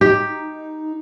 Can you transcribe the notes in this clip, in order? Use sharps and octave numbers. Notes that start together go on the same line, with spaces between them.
D#4 G4